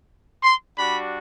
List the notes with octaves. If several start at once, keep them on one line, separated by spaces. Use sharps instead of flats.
C6
G3 D4 F#4 B5